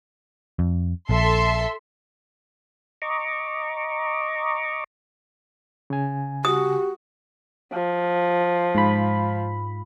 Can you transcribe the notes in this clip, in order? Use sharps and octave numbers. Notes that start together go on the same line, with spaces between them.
F2
A#1 A4 E5 C6
D#5 A#5 C#6 D6
C#3 G#5
F#4 G4 D#6
F3
G#2 B5